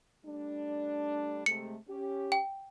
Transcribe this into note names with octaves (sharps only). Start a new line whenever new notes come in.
G3 A3 D4
C3 G#3 A3 C#7
C#4 G4
G5